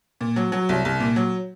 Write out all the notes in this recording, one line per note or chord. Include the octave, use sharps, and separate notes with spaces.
A#2
F#3
F#3
C2
C2
A#2
F#3